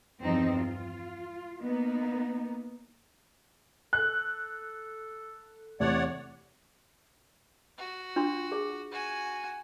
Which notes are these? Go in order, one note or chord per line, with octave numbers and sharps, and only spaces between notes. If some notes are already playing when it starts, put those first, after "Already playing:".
E2 G2 F3 C4 D#4
F4
A#3 B3 D#4
A4 F#6
E2 C3 A3 C#5 D5 F#5
F#4
D4 F4 C6
G#4
F#4 G#5